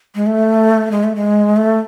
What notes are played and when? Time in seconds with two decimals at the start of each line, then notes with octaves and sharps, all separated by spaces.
0.15 G#3
0.26 A3
0.91 G#3
1.04 A3
1.16 G#3
1.56 A3